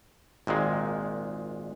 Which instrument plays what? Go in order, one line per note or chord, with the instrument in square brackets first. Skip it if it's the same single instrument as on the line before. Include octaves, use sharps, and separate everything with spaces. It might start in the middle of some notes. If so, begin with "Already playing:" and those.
[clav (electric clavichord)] G#1 A#2 D#3 G#3